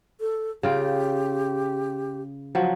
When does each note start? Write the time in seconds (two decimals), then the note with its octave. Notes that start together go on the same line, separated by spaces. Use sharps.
0.21 A4
0.63 C#3 F4 G4 G5
2.55 F3 F#3